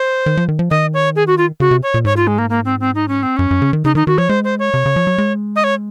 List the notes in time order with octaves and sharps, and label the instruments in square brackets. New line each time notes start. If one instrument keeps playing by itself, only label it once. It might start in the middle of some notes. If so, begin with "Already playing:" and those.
Already playing: [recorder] C5
[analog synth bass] D#3
F3
D#3
F3
[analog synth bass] D#3 [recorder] D#5
[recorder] C#5
G#4
F#4
F4
[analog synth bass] C#3 [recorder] F#4
[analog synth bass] C3
[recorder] C#5
[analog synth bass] A#2
[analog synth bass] G#2 [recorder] C#5
[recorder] F4
G#3
A#3
A#3
C4
C4
D#4
C#4
C4
[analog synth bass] F#2 [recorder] C#4
[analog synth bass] F#2
C#3
D#3
[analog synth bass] C#3 [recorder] D#4
[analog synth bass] D#3 [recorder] D#4
[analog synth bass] D#3 [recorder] F#4
[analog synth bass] F3 [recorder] C#5
[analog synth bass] G#3 [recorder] C5
[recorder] C5
C#5
[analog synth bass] C3
C#3
F3
F#3
G#3
[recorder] D#5
C#5